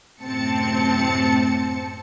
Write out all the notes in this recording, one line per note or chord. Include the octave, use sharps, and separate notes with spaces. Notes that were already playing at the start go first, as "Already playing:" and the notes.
F#2 A2 C3 C4 A5 C#7